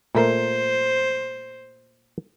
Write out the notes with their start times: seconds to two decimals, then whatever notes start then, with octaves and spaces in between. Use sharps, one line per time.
0.15 A#2 A3 A#4 C5